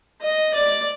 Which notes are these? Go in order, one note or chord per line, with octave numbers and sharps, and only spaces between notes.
D#5
D5